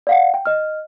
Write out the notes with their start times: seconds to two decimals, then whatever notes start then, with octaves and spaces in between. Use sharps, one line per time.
0.07 D5 F5 F#5
0.34 G5
0.46 D#5 F6